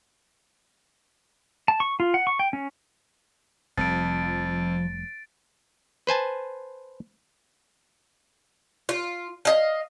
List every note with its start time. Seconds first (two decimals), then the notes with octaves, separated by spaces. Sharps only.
1.68 A5
1.80 C#6
2.00 F4
2.14 F#5
2.27 C#6
2.39 G5
2.53 C#4
3.77 F1 F2 F3 G3 A6 D7
6.07 B4 C5 G#5 A5
8.89 F4
9.45 D#5 F5